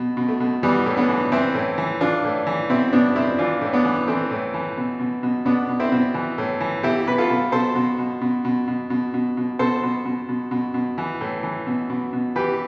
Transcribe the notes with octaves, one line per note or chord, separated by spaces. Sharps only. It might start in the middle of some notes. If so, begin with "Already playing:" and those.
Already playing: B2
B2
A3
B2
E3 G3 B3
A2
B3 D4
E3
E3 C4 E4
A2
E3
E3 D4 F4
A2
E3
B2 C4 E4
B2 B3 D4
B2 C4 E4
E3 D4 F4
A2
B3 D4
E3
E3 A3 C4
A2
E3
B2
B2
B2
B2 B3 D4
B2
C4 E4
B2
E3
A2
E3
B2 E4 G4
B2 B4
F4 A4
B2
B2 A4 C5
B2
B2
B2
B2
B2
B2
B2
B2
B2 A4 C5
B2
B2
B2
B2
B2
E3
A2
E3
B2
B2
B2
E3 G4 B4